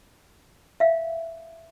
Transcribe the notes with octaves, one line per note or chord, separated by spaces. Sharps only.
E5 F5